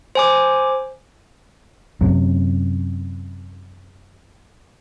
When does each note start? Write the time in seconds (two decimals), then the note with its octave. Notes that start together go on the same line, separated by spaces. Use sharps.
0.15 C5 G#5 D6
2.01 F#2 C3